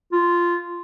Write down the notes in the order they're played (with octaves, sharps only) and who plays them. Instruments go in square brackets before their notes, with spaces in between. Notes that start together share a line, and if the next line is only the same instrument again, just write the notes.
[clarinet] F4